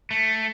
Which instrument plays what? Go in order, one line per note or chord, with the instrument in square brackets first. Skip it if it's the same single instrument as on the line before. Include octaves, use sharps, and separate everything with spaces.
[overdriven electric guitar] A3